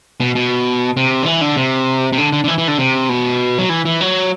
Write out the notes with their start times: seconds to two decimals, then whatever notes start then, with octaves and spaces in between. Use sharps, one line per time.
0.20 B2
0.35 B2
0.97 C3
1.22 D3
1.26 E3
1.41 D3
1.56 C3
2.13 C3
2.18 D3
2.32 D3
2.44 D3
2.48 E3
2.58 E3
2.68 D3
2.79 C3
3.09 B2
3.58 F#3
3.69 E3
3.85 E3
4.01 F#3